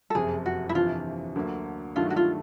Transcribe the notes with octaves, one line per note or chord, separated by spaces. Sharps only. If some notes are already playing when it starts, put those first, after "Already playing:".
A4
F#1 F2 C3 G#4
F#4
E4
G1 F2 C3 E3 F4
D2 D3 F#3 A#3
G2 D#3 F#3 A3 D4 F4
F#4
F4